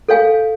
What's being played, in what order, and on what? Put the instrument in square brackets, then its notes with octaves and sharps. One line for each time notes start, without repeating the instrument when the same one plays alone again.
[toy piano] A4 C#5 F5 G#5